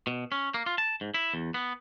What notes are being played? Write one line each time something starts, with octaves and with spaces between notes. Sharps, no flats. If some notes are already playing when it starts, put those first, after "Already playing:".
B2
C#4
A#3
F4
A5
G#2
E4
E2
B3